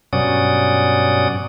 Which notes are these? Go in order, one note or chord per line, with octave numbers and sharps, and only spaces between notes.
G2 B2 F#3 C#4 D5 D#6